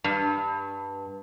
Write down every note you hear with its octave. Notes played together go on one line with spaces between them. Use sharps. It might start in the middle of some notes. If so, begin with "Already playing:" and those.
G2